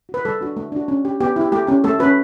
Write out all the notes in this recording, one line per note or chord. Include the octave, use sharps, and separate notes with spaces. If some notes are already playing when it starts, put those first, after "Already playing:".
F#4
B4
G3 A4
D4 F#4
A3
D4 F#4
C#4
G4
B3 G4
E4 G4
A3 G4
C#4 G4
A3 A4
C#4 F#4 B4